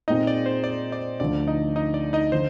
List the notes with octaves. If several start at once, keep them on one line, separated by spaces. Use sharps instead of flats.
A#2 G#3 C4 D#4 F4 G#4 D#5
D5
C5
D5
D5
D2 D3 F3 D5
D#4 D#5
D#4 D#5
D5
D#4 D#5
D3 F3 C5